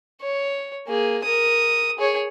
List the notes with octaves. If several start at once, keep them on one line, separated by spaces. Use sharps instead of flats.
C#5
A#3 G#4
A#4 D#6
G#4 C#5